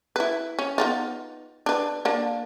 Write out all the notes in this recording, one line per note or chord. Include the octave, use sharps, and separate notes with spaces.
E4 B4
C#4
B3 D#4 F4
D4 B4
A#3 D4